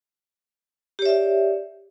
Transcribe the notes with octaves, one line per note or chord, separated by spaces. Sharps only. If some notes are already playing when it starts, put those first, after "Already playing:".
G4 C#5 D5 E5